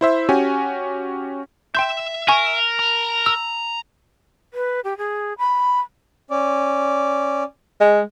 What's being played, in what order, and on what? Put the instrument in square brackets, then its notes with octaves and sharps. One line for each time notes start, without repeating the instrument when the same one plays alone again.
[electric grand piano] E4 C5 E5
C#4 F#4 G4 G#5
[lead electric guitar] E5 [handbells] G5 C6 G6
[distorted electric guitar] A#4 [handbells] G#5 C#6
[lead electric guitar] A5 A#5
[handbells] E6
[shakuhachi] B4
G4
G#4
B5
[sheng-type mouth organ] C#4 D5
[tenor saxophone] G#3